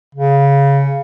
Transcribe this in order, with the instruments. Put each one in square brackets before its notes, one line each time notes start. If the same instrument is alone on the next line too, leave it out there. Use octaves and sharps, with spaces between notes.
[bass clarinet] C#3